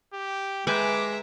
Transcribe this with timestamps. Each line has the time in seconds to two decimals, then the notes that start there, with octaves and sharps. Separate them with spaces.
0.14 G4
0.67 G#3 B4 E5 G5 G#5 A#5 D6